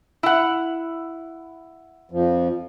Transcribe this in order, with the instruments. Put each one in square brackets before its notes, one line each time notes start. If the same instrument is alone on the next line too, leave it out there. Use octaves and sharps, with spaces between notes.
[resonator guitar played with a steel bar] E4 F#5
[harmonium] F2 F3